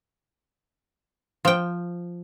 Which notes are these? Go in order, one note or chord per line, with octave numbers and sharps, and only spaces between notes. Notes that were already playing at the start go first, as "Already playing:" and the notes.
F3 G5